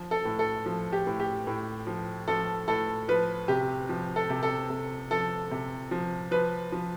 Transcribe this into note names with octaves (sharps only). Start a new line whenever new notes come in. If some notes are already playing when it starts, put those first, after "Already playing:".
Already playing: F3
A4
A2
A4
F3
G4
A2
G4
A2
F3
F3 A4
A2 A4
F3 B4
C3 G4
F3
A4
C3
A4
C3
F3 A4
C3
F3
F3 B4
F3